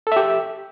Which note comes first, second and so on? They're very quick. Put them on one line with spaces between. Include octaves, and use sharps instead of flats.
A4 E5 G4